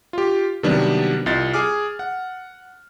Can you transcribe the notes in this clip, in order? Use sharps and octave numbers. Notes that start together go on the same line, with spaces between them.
F4 G4
C3 D#3 F#3 G3 B3 D4
C2 F4 D#5 A6
G#4 G#5 D6 F6
F#5